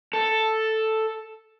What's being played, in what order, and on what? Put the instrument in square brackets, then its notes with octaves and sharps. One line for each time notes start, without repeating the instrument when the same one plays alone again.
[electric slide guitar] A4